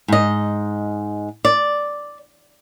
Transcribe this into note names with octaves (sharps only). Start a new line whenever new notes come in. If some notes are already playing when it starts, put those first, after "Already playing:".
G#2 D#5
D5